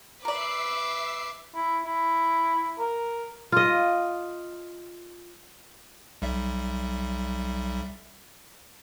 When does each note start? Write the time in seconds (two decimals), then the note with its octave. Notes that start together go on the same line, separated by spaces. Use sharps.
0.25 A#4 B4 D5 E5 D6 C7
1.55 E4
1.86 E4
2.79 A#4
3.52 F4 D#5
6.22 B1 G3 E5